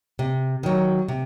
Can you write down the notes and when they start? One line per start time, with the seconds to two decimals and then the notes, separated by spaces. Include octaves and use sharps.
0.19 C3
0.63 D#3 F#3
1.08 C3